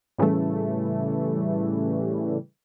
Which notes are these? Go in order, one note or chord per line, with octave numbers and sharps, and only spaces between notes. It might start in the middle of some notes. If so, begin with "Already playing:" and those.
A2 C#3 E3 G3 A3